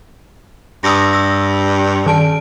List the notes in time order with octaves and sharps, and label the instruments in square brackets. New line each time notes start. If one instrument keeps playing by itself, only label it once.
[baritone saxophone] G2 [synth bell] D#6 E6 A#6
[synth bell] E6 A#6
D#3 A5 D7